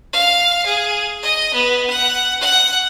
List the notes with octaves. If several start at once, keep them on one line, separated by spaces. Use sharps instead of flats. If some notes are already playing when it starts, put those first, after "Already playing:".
F5
G#4
D#5
B3
F#5
F#5